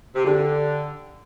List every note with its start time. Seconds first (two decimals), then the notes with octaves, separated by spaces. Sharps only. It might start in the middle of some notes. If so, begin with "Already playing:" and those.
0.15 C3
0.25 D3 G4